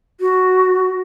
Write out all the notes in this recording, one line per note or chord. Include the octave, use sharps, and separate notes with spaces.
F#4